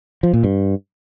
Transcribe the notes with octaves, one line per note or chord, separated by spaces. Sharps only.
F3
A#2
G2